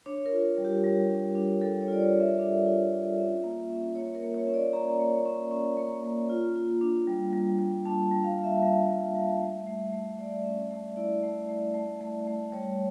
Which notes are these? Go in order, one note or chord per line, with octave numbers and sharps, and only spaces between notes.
D4 C#5
A#4
F4
G3
G4
G3
D4
D4
G3 A4
C#5
F4 D5
C#5
G3
E5
D4
F4
F4
C#4
A#3
C#4
A#3 C#5
A#4
A#3
C#5
C#4
D5
C#4 A#5
A#3
C#4
C#4
A#3
A#3
F4
F4
D4
G3
G3
G3
D4 A5
G3
F5
G3
E5
G3 E5
G3
G3
A3
A3
A3
A3 D5
C#4
A3
E4 D5
A3
A3
A3
A3
A3
G3 C#5